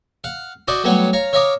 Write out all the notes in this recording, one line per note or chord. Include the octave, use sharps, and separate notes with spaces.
F5 F#5
E4 F#4 C5 D5 D#5
F#3 G3 A3 B3 C#5 F#5
C#5 F5 A#5
C#5 E5 F5 A#5 D6 D#6